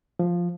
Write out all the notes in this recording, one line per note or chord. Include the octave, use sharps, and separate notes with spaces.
F3